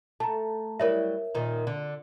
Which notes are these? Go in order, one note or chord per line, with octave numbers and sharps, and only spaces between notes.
A3 A5 A#5
F#3 G3 E4 A#4 C#5 E5
A#2 D#3
D3